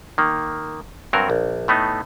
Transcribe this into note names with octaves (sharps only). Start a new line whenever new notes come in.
D#3 A#3
G2 F#3 C4 F#4 A#4
A#1
A2 A3 B3 D#4